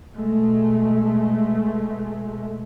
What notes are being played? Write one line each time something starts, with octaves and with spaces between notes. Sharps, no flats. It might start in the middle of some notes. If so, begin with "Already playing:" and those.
B2 G#3 A3